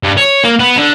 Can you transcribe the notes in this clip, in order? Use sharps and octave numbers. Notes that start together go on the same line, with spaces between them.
G2
C#5
A#3
B3
D3